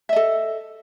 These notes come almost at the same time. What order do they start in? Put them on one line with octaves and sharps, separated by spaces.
E5 D#5 A4